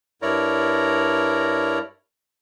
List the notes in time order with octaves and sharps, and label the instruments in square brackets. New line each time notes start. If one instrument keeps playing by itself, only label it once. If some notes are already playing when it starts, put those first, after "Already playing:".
[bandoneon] G2 E4 A#4 C#5 D5 A#5